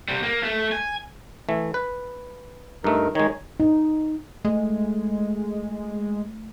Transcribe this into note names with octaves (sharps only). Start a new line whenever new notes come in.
C3 G3
A#3
A3
G#5
E3 A3
B4
G2 A3 D#4 A#4
D#3 G#3 D#4 C#5
D#4
G#3 A3